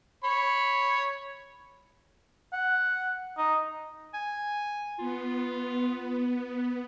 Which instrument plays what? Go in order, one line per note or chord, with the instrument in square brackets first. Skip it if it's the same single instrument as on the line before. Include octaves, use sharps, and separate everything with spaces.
[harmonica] C#5 B5
[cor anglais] F#5
D#4
[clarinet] G#5
[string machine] B3 [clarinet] F4